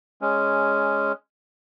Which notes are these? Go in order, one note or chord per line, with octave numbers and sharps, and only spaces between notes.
G#3 C#4